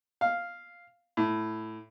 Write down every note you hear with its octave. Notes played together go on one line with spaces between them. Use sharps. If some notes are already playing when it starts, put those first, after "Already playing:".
F5
A2